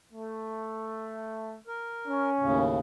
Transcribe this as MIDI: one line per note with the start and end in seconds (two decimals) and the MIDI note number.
0.13 1.56 57
1.67 2.29 70
2.08 2.61 61
2.40 2.79 39
2.40 2.79 45
2.40 2.79 49